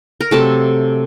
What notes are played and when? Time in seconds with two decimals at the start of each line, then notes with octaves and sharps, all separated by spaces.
0.21 A#4
0.31 C3 F#3 A3 A4